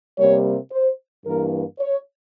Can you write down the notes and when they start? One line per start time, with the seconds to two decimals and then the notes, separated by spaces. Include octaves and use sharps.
0.19 C3 G3 A#3 C#5
0.72 C5
1.26 G2 E3 A#3 A#4
1.80 C#5